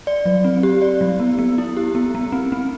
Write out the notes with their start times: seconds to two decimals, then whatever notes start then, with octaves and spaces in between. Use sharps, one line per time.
0.07 D5
0.26 F#3
0.44 C4
0.63 G4
0.82 D5
1.01 F#3
1.20 B3
1.39 B3
1.58 E4
1.77 G4
1.95 B3
2.15 B3
2.32 C4
2.52 C4